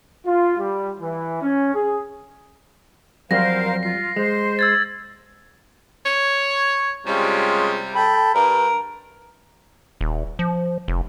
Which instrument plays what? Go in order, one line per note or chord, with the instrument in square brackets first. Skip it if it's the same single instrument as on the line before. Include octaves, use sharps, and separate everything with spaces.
[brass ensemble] F4
G3
E3
C#4
G#4
[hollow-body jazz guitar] F2 F#3 G3 [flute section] A#4 C5 F5 [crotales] A#6
[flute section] F4 [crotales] C7
[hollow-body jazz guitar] G#3 [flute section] C5
[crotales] E6 G#6 A6
[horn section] C#5
[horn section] C3 G3 [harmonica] G#3 C#4 F4
[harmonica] A4 G5 B5
[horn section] G2 [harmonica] A#4
[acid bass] D#1
F3
F1